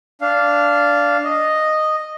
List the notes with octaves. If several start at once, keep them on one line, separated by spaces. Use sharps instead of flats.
D4 F5
D#5